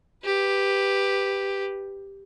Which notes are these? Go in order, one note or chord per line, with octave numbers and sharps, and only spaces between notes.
G4 B4